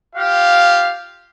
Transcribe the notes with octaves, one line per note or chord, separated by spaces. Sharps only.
F4 G4 F5